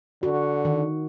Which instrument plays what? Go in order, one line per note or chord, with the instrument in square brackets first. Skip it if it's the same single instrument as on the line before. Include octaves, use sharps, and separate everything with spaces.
[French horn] D3 [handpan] F#4
[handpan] D#3